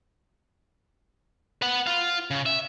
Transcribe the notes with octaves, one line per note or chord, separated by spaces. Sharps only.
B4 F#5
F4 F5
C#3
E5